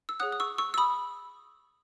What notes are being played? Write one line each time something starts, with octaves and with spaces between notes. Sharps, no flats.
E6
G#4 C#5 F#5 D#6 F#6
D#6
C#6 E6
C#6 E6
E6
B5 D#6